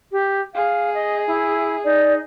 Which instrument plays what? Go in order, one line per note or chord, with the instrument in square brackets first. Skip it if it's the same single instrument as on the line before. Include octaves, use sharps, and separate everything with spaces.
[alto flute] G4
[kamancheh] G#4 [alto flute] F5
[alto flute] D#5
E4
[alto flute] D#4 [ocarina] D5